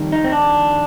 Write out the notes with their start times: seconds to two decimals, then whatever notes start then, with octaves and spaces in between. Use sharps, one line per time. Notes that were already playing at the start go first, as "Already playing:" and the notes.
Already playing: F2 D#3 G3
0.12 D#4
0.24 C4
0.32 D4